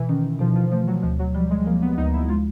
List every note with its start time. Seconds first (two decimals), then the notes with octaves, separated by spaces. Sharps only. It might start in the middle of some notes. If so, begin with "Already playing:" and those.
Already playing: B2 E3
0.09 D#3 C#4
0.40 B2 F3
0.56 F3
0.72 F3 A3
0.87 F#3
1.03 D2 F3
1.19 F#3
1.35 F3 G3
1.50 G#3
1.66 F3 A#3
1.82 B3
1.98 D2 D#4
2.13 E4
2.29 G#3 F4